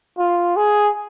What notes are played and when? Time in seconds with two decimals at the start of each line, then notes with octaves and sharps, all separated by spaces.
0.18 F4
0.56 G#4